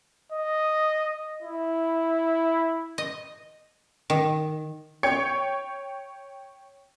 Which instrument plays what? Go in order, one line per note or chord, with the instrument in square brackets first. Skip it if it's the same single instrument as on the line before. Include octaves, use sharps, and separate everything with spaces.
[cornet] D#5
E4
[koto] D#5
D#3
[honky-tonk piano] C#5 G5 C#6 G#6 C#7